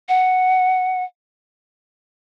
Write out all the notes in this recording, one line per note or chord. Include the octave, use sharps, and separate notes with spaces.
F#5